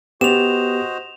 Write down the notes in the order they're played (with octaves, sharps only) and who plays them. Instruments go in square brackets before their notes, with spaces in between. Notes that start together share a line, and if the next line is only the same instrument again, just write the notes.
[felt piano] B3 [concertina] F#4 C5 D#5 [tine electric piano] G4 [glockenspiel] E7 F7